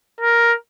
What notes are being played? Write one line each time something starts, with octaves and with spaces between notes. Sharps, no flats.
A#4